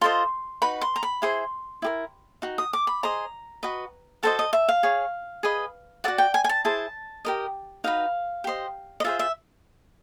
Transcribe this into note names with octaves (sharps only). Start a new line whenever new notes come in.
F4 A4 C5 D#5 C6
D#4 F#4 B4 B5
C6
A#5
B5
E4 G#4 C5 C6
E4 G4 A#4
D#4 F#4
D#6
D6
B5
G#4 C5 D#5 A#5
F#4 B4 D#5
F#4 A4 C5 D#5 A5
D#5
E5
F5
G#4 C#5
G#4 B4 D#5
F#4 A4 D5 F#5
G5
G#5
G#5
A5
E4 G#4 C5 A5
G4 A#4 D#5
D#4 F#4 B4 F5
G4 C5 D#5
D#5
F4 G#4 C5 E5
E5